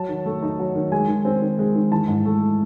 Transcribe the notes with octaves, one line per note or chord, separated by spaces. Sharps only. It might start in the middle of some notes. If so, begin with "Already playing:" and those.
Already playing: F#3 A5
D#3
A3
D#4
F#3
D#3
G#3 G#5
D#3
C4
D#3
G#3
D#3
E3 A5
G#2
A3